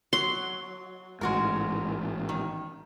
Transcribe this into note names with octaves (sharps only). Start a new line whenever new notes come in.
F#3 C6
A1 G#2 G#3 F#4 A#4
D#3